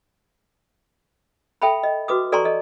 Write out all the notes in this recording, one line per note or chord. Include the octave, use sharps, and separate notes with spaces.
A4 E5 G5 A5 B5
D#5
F#4 B4 D6 D#6
A4 D5 G#5 A#5 C6 C#6
A4 D#5